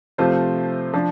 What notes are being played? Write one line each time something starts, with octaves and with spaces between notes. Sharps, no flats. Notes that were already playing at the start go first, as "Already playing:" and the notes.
C3 F3 A3 F4 C5
F3 D4